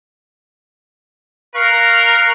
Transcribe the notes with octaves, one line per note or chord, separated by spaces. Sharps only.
A#4 F5 C#6 F#6